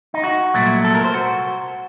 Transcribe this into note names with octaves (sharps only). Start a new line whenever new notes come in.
D#4
F#4
C2 A#2 F#3 A3
A4
A#4
C5
F#4